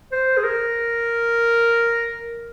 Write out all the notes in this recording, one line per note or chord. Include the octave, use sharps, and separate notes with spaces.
C5
G#4
A#4